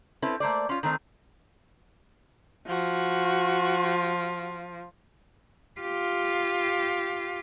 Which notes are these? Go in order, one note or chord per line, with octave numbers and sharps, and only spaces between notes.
C4 C#4 E4 A4 B4
A3 A#3 C5 D5
C#4 F4
D#3 A3 C4 D#4
F3 F#4
F4 G4